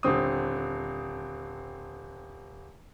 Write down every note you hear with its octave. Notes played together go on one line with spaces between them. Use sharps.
D#1 D3 C4 D#6